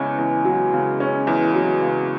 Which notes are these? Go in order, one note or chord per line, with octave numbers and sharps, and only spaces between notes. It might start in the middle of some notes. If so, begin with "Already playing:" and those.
Already playing: E2 C#3 G#3 C#4
E2
F#3
C#3
C#4
E2
F#3
C#3